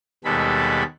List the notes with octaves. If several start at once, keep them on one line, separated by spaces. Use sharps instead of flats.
D#2 B2 G3 G#3 A4 B5